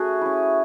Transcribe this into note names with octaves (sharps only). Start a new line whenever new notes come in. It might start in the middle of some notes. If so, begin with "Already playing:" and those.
Already playing: A3 C#4 F#4 G#4
C#4 E4